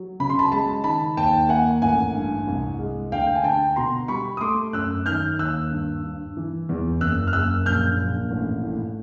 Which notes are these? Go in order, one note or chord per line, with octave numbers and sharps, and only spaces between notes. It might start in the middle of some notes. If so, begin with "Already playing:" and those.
Already playing: F#3
C#3 B5
C6
A5 B5
G#3 A5 B5
D#3 A5 B5
D#2 G5 A5
A#3 F#5 G#5
A1 F#5 G#5
G2
C2
G#3
D2 F5 G5
G5
G#5
D3 G5 A5
B2 A#5 C6
G3 B5 C#6
D#6
A3 C6 D6
F#2 E6 F#6
D#3 F6 G6
D#2 E6 F#6
G2
G2
E3
E2
F#1 E6 F#6
F6
F#1 E6 F#6
A#1 F6 G6
A#1
A1
A2